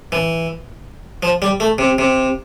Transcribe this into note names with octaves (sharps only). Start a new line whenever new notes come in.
E3
F3
G3
A3
C3
C3